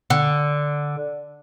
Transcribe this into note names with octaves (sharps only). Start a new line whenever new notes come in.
D3